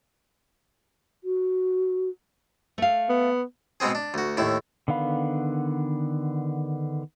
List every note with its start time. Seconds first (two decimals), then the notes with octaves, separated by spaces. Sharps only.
1.23 F#4
2.78 A3 F5
3.09 B3
3.80 B2 G#3 B3 C4 G#4
3.95 D4
4.14 D2 F#4
4.37 D#2 A2 E4
4.88 D3 D#3 B3 F5 B5